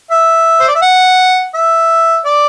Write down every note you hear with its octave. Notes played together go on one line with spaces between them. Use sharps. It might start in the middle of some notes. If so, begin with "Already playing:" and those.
E5
C5
D5
E5
F#5
E5
D5